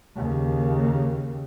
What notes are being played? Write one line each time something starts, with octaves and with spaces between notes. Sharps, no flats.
D#2 C#3